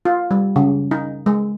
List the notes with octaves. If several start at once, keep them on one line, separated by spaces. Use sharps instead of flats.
F4
G3
C#3
D#4
G#3